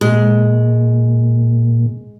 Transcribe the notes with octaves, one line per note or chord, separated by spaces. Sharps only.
A#2 G#3